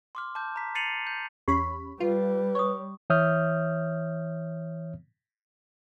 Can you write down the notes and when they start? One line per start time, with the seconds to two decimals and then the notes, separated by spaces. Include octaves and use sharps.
0.15 C6 D6 F6
0.35 A5 D6 G6
0.56 A#5 B6
0.75 A6 C7 C#7 D#7 F7 F#7
1.07 G6
1.48 E2 C#4 G4 B5
2.00 G3 F4 B4
2.55 C#5 C#6 D#6
3.10 E3 C#5 E5 D#6 F6 G6